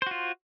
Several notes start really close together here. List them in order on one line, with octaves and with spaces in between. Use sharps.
C5 F#4 F4